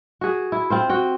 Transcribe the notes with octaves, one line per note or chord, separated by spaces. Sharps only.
F#4 G#4
E4
C4 F4 C5
F#4 G5